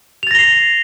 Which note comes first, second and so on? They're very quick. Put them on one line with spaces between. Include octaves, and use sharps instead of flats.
F7 A6 A#6 G7 C7